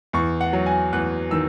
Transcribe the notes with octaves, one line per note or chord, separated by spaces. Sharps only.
E2 C#6
F#5
F#3
G#5
E2 F#6
D#3 E6